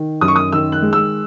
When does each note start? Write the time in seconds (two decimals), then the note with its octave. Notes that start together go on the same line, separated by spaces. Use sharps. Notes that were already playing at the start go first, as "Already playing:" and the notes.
Already playing: D#3
0.21 F#2 D#6
0.28 C#6
0.36 D#6
0.52 D#3 E6
0.72 F#6
0.82 G#3
0.93 E6